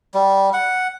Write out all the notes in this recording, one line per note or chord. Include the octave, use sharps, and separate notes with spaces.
G3
F#5